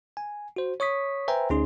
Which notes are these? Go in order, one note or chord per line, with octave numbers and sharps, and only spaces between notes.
G#5
F#4 C5
C#5 C#6 D#6 B6
B4 C5 E5 G5 G#5 A#5
D2 C#4 D#4 G#4 C6